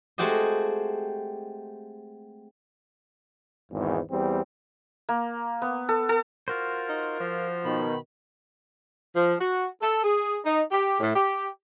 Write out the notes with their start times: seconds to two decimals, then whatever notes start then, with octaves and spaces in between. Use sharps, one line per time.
0.18 G#3 A3 C4 F#4 G4 D#5
3.71 G#1 E2 G#2
4.10 E2 G3 C4
5.09 A#3
5.62 B3
5.89 A4
6.09 A4
6.48 F4 F#4 A#4 C5
6.89 D#4
7.20 F3
7.64 B2 D#3 B5
9.15 F3
9.40 F#4
9.80 A4
10.04 G#4
10.45 D#4
10.70 G4
11.00 A2
11.14 G4